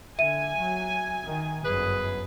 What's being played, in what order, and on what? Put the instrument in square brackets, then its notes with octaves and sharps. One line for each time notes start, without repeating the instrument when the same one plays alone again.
[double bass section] D3 [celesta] E5 D#7 [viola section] G#5
[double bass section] F#3
D#3
[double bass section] G1 F#2 [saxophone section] G#4 B4